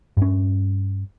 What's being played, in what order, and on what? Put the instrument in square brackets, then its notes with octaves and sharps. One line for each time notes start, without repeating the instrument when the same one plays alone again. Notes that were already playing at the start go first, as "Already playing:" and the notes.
[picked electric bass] G2 C#4